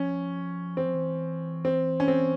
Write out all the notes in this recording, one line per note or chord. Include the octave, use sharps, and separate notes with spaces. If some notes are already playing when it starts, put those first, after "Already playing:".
Already playing: F3 C#4
E3 C4
F3
E3
C4
C#4
C4